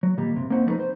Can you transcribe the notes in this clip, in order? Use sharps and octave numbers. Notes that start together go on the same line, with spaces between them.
F#3
A#2 D#3 G3 A#3
C#2 G2 C3
A#3 C4 C#4 D#4 C5 F#5
F3 G3 A3 C#4 D#4 B4
C5